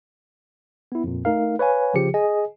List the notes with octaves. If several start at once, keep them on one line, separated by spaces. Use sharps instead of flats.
B3 E4
F2 A#2
A3 D#4 A#4 F5
B4 C#5 F5 G#5
G1 C#3 F3 G4 C#7
G#4 D#5 G#5